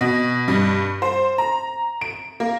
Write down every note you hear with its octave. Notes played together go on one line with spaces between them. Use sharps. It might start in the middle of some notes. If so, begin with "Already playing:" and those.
B2
G2
C5
A#5
D7
A#3